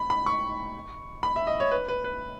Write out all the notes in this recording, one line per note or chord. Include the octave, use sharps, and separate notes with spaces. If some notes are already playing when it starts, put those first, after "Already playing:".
Already playing: B5
B5
C#6
B5
E5
D#5
C#5
B4
B4
B4